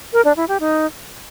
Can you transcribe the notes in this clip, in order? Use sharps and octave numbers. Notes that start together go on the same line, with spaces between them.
A#4
D4
E4
G4
D#4